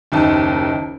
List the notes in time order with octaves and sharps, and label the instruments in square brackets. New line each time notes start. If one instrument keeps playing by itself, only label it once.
[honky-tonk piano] F#1 D#2 D#4 A5